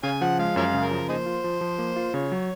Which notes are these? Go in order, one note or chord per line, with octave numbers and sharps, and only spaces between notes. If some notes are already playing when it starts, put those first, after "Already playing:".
C#3 C#5 F5 G#5
F3 F#5
G#3 F5
F#2 A#4 C#5 F5
C#3
A#4
F3
A#3 D#4 G#4 C5
F4
F3
F3
A#3
F4
C#3 C#5
F#3